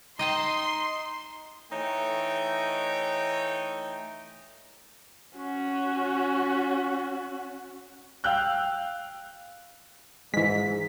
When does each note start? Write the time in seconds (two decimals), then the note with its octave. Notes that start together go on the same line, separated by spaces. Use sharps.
0.19 D#4 D#5 G5 A5 C6
1.71 E3 A3 D#4 C#5 G5
5.36 C#4 F#4
8.24 F5 G5 E6 F#6 G6
10.34 G#2 E3 G#3 B6